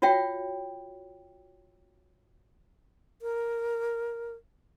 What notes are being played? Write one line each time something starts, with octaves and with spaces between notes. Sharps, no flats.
F4 F#4 C#5 E5 G5
A#4